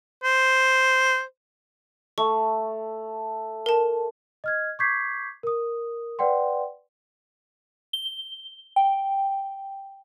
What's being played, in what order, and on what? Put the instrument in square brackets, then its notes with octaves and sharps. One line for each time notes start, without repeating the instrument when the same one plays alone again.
[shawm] C5
[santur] A3 [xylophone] C#6
[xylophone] A#4 A5
[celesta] D#5 F6 G#6
C#6 D6 G6 G#6 B6 C7
A#4 D#6
B4 D5 F#5 G5 C6
[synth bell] G7
G5